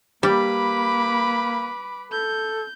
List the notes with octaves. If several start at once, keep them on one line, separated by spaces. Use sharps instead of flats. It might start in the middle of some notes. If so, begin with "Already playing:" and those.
G3 A#3 B4 B5 D6
A4 G6